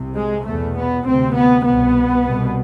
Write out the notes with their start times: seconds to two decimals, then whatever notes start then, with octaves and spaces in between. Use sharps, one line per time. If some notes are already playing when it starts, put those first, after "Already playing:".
Already playing: C2 C3
0.17 G#3
0.47 E2 B2 A3
0.77 B3
1.06 D2 C3 C4
1.36 B3
1.66 C2 B2 B3
2.26 C2 B2